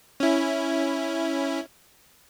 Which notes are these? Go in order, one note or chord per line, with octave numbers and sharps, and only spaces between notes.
C#4 E4